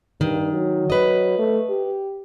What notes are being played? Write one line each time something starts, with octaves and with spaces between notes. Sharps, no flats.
G2 D#3
F#3
B4 D#5
A3
G4